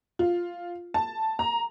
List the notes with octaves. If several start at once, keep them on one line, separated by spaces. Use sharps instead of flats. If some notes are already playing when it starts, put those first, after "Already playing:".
F4
A5
A#5